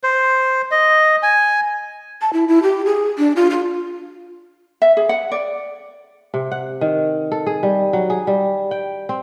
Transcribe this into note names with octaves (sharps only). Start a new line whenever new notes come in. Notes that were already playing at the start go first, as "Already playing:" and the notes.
C5
D#5
G#5
A5
E4
E4
G4
G#4
D4
F4
F4
E5
G#4
F#5
D5
C3
F#5
D#3
A4
G#4
G3
F#3
G#4
G3
G5
C4